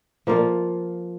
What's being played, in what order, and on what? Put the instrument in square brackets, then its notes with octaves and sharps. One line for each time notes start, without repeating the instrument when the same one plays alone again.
[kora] F3 A#3 F4